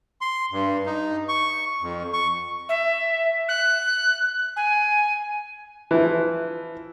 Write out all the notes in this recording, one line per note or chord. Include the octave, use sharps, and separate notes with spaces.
C6
G2
D#4
C#6
F2
C#6
E5
F#6
G#5
E3 F3